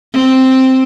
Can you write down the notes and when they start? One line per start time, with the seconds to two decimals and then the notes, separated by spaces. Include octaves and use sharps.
0.13 C4